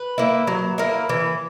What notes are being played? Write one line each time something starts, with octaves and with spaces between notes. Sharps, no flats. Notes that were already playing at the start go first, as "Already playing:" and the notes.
Already playing: B4
A#3 E4
F#3
A#3 E4
E3